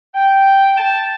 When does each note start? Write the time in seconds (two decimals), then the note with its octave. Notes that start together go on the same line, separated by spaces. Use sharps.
0.15 G5
0.78 A5